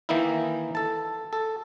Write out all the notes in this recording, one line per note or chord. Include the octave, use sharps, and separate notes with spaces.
D#3 E3 A#3 D#4 E4
A4 A5
A4